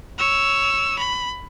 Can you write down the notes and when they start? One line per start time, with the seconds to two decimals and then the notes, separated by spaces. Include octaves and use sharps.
0.18 C#5 E6
0.99 B5